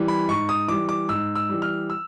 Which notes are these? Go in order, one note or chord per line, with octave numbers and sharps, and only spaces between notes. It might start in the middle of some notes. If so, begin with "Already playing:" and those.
Already playing: E3 G3
B5
G#2 C#6
D#6
E3 G3 D6
D6
G#2 E6
E6
E3 G3
F6
E6